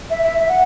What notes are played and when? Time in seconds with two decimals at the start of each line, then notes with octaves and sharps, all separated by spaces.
0.10 E5
0.23 E5
0.39 E5
0.49 F#5